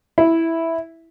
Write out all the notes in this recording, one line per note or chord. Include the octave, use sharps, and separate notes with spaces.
E4